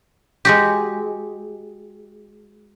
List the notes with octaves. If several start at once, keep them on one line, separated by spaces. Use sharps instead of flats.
G#3 F#4 G4